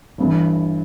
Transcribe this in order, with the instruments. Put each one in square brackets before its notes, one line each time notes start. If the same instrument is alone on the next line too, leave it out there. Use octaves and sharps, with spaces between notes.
[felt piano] G1 G2 E3